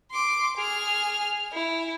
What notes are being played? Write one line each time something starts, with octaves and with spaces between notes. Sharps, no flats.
C6 D6
G#4 F6
E4